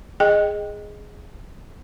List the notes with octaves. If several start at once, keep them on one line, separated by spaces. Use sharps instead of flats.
G#4 D#5 G5